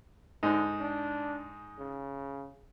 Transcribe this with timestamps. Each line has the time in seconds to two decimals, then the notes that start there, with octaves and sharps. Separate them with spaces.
0.43 G#2 D3 D#4
0.81 D4
1.78 C#3